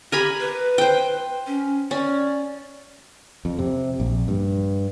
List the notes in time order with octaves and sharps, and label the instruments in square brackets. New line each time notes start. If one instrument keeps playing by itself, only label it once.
[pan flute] G4 [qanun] A#4 G#5 B5
[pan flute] B4
[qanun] C5 G5
[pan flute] C#4
[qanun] C#4 [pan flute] D5
[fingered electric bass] F2
C3
A#1
G2